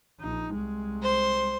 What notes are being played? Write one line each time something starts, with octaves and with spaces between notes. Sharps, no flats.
A#1 D#4
C2 G#3
C5 C6